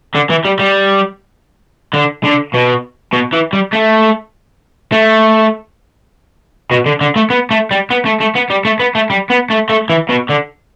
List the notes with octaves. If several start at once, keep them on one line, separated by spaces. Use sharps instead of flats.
D3
E3
G3
G3
D3
D3
B2
B2
E3
G3
A3
A3
B2
D3
D3
A3
B3
A3
G3
B3
A3
A3
B3
G3
A3
B3
A3
G3
B3
A3
A3
E3
B2
D3